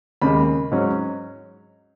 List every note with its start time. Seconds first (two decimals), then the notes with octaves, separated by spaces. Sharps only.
0.22 D#2 C#3 G#3 B5
0.72 G#2 F#3 C#4